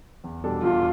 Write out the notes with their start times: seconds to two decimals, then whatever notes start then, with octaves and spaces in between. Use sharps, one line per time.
0.24 E2
0.44 B2 G3 D4 A4
0.63 E2 F4